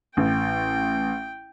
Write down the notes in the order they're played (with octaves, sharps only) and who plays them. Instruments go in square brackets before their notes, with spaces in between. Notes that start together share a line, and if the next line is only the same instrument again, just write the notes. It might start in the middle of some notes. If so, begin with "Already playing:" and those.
[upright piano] A1 [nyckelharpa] G5